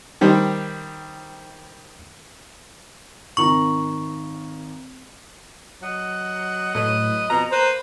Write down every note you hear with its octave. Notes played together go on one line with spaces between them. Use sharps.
D#3 G3 G4 C5
G#1 D#3 A#5 C#6
F#3 D#5 F#5
A2 F#3 B4 D#5
F2 B2 A#5
A#3 B4 C5